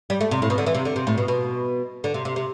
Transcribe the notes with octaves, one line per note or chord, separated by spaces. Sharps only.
G3
A3
C3
A2
B2
D3
E3
C3
D3
C3
A2
B2
B2
D3
C3
C3
C3